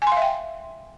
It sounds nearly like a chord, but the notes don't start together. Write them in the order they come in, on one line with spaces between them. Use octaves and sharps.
G#5 C6 F5 E5 G5